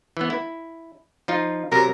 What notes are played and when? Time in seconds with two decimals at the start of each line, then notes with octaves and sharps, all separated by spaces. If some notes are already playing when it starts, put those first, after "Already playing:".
0.17 E3 B3
0.30 E4
1.28 F3 D#4 F4
1.72 C3 F#3 A#4